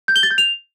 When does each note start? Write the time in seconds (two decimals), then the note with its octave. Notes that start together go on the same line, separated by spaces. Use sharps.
0.08 G6
0.16 G7
0.23 A6
0.31 G6
0.38 F7